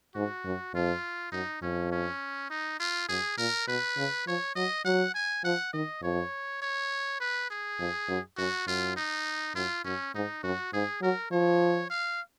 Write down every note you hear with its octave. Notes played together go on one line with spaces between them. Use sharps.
G#2 F#4
F#2
F2 F4
F#2 D#4
F2 C#4
C#4
D#4
F4
F#2 G#4
A#2 A#4
B2 B4
C#3
F3 C#5
F#3 D#5
F#3 F#5
G#5
F3 F#5
D#3 D#5
F2 C#5
C#5
B4
G#4
F2
F#2
F#2 F#4
F#2 F4
D#4
F#2 F4
F#2 C#4
G#2 D#4
F#2 F#4
G#2 G#4
F#3 A#4
F3 C#5
F5